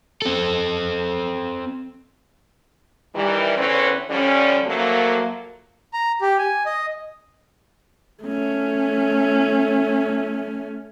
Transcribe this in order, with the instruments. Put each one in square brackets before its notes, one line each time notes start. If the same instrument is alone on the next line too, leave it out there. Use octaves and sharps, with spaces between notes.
[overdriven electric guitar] C4 A4
[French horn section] D#3 E3 G3
E2 D3 C4 C#4 B4 C#5
D3 F3 G3 C#4
F3 F#3 A3 A#3
[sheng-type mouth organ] A#5
G4
G#5
D#5
[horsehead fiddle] A3 C#4